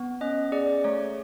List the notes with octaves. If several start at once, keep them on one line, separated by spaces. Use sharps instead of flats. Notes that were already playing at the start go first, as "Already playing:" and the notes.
Already playing: B3
C#4 D#5
G#4 D5
A3 C#5